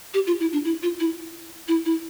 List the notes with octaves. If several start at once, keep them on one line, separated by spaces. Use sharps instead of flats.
G4
F4
E4
D4
E4
F4
E4
E4
E4